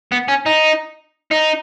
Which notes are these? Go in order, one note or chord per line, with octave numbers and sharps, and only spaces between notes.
B3
C#4
D#4
D#4